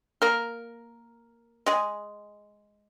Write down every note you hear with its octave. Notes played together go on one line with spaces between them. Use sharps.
A#3 A#4
G#3 G#4